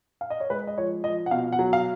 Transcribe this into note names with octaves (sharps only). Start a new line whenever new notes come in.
F5
D#5
C#5
G#3 B4
D#5
F3 C#5
F3 D#5
F#5
B2 F5
F#5
F#3
F5